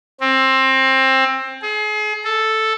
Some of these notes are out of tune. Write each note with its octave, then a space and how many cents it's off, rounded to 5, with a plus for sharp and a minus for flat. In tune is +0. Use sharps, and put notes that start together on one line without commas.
C4 +20
G#4 +35
A4 +0